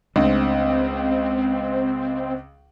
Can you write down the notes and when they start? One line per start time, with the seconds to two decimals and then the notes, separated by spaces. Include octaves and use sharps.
0.16 C#2 G#3 A3 C4 D4